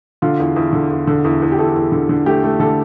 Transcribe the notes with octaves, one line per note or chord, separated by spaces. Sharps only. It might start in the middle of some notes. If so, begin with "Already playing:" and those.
D3 F4
E2
E2
D3
E2
D3
E2
E2
G4
E2 A4
E2
D3
D3
A3 G4
A3
D3 A4